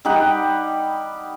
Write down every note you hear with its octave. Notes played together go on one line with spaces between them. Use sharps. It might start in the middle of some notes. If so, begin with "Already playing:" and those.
G3 D#4 G4 F#5